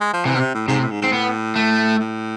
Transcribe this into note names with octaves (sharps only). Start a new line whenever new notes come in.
G#3
F3
C3 E3
B2
C3
A2
G#2 C3
A2
G#2
G#2 C4
A2 B3
A3
A2